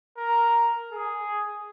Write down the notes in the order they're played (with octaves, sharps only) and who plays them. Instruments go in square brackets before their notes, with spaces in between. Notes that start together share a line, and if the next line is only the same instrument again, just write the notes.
[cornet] A#4
G#4